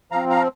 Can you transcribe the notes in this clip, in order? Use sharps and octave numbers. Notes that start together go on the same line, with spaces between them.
F3 C4 F5 A#5
F5 A#5